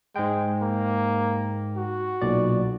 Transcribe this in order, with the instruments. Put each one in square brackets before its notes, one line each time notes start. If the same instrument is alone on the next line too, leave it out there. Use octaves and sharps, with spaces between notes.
[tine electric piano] G#2 G5 [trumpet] G#3
[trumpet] A#3
F#4
[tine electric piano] B1 A#2 D5